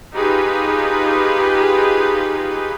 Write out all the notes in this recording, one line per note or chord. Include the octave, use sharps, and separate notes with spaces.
D#4 F4 G4 G#4 B4